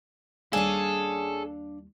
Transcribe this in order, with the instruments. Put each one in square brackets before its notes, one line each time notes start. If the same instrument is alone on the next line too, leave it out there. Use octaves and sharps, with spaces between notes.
[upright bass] D#2 G3 [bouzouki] C#4 G#4 [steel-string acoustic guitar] D4 F5 [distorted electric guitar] A4